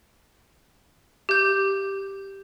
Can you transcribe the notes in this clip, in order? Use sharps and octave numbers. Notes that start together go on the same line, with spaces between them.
G4 G6